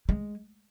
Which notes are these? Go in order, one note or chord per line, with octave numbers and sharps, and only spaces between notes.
G#3